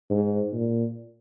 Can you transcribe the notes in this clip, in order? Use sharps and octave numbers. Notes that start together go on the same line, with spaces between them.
G#2
A#2